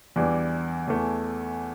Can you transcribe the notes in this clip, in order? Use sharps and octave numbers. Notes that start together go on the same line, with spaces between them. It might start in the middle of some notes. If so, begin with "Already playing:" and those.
E2 E3 G3 D4
E2 E3 A3